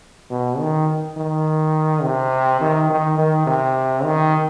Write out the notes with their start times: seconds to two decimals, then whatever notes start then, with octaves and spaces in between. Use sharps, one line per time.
0.30 B2
0.59 D#3
1.17 D#3
2.03 C3
2.61 D#3
2.90 D#3
3.18 D#3
3.46 C3
4.04 D#3